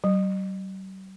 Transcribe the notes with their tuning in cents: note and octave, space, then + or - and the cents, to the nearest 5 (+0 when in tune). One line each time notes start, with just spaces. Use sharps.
G3 -45